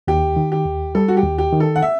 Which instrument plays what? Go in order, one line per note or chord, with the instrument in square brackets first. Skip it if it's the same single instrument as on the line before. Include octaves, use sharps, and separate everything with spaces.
[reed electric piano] D#2 [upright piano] G4
[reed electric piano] D#3
[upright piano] G4
[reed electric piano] D#2
[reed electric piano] G3 [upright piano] A4
[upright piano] F#4
G4
[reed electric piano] D#2
[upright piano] G4
[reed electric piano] D#3
[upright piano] A4
F#5
E5